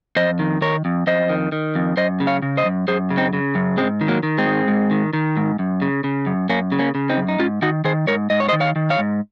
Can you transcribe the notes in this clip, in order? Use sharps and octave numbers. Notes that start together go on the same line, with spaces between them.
F2 C5 D#5
D#3
D#3 A#4 C#5
F2
F2 C5 D#5
D#3
D#3
F2
F#2 C5 D#5
C#3
C#5 F5
C#3
C5 D#5
F#2
F#2 G#4 C5
C#3
C4 D#4
C#3
F#2
G#2 G#3 C4
D#3
F#3 A#3
D#3
G#3 C4
G#2
G#2
D#3
D#3
G#2
F#2
C#3
C#3
F#2
F#2 A#3 C#4
C#3
A#3 C#4
C#3
C4 D#4
F#2
D#4
G#2 C#4 F4
D#3 D#4 F#4
D#3 G#4 C5
G#2 A#4 C#5
G#2 D#5
C#5
C5 D#5
D#3
C#5 F5
D#3
C#5 F5
G#2